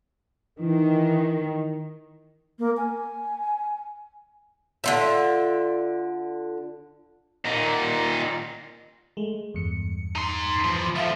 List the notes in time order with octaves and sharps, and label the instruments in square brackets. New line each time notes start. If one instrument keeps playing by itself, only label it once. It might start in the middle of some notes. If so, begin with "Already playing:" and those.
[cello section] D#3 [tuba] E3
[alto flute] A#3
G#5
[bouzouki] D3 F4 E5
[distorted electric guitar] A#2 D#4
[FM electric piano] G#3 A3
E2 G2 C#7
[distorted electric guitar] D#4 C6
E3 F3
[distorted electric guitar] D3 F3 [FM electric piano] E5 F5